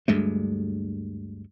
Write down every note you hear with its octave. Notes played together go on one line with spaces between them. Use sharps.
D2 G2 G#3 A3